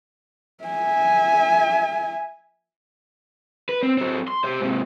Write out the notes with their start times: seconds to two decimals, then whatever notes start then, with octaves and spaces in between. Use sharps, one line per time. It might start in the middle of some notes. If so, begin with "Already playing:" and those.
0.64 E5 G#5
3.69 B4
3.83 C4
3.98 F#3 C4
4.28 C6
4.44 G4 C5
4.61 G#2 C3